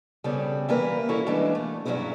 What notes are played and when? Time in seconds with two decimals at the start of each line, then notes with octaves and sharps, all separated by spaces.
0.24 C#3 G3 B3 C4 G#4 A4
0.69 E3 G3 A#3 C#4 A#4 B4
1.09 C#4 E4 F#4 A4 C#5
1.26 E3 G3 G#3 A#3 D4 F#4
1.55 A3
1.85 G2 F#3 A3 C#4 E4 G#4